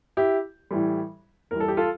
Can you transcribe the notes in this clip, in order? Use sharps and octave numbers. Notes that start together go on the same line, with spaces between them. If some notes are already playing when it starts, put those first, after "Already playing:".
E4 G4
A2 E3 G3
E2 E3 G3 A#4
A4
G4
F4 A4